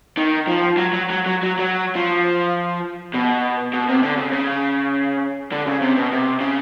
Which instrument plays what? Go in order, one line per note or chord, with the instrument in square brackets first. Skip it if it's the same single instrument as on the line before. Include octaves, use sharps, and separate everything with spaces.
[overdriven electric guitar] D#3
F3
F#3
F#3
F#3
F#3
F#3
F#3
F3
B2
B2
C3
D3
C#3
C#3
D3
C#3
C3
B2
C3
C#3